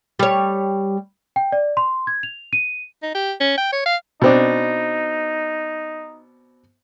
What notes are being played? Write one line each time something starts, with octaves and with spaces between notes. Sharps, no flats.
G3 C#5
G5
D5
C6
G#6
F7
D#7
D#4
G4
C#4
G5
C#5
F5
B2 C4 D4 D#4